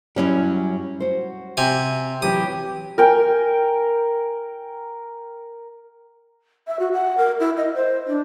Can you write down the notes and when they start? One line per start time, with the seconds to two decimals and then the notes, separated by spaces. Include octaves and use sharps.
0.16 F#2 F#3 G3 C#4 E4
1.00 F#4 C5
1.57 C3 G#5
2.22 E3 F#3 G4 D#6
2.98 A#4 G5 G#5
6.67 E5
6.79 F#4
6.93 F#5
7.18 A#4
7.40 E4
7.57 D#5
7.74 C5
8.07 D4